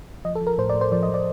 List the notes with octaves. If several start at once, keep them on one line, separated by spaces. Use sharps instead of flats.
F3 D#5
A4
F3
A#4
A2 C5
D5
A2
C5
F3 D5
D#5
F3 D5